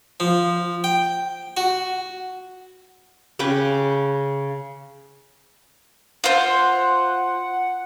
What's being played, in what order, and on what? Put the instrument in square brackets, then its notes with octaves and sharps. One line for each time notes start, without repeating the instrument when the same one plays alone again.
[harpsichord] F3
G5
F#4
[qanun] C#3 B4 G5 D6
[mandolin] F4 C5 [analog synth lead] F#5